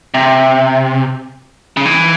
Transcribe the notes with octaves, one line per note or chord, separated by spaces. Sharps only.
C3
C#3
E3